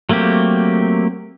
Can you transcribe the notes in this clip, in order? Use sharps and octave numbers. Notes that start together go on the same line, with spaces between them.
F#3 A3 A#3 C4 G4